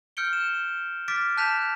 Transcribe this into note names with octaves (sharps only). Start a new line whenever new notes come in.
F6 G6 C#7 D7 G7
E7
D6 F6 A6 B6 D7
A5 F#6 G6 B6 E7 F7